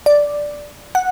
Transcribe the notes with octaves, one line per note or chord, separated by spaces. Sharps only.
D5
F#5